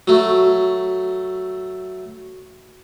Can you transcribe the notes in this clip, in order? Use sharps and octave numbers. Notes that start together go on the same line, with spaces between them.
F#3 A3